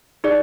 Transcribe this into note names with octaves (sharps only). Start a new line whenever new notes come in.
D#4 G#4 D5